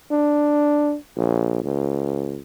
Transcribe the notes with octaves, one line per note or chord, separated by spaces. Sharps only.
D4
A#1
C#2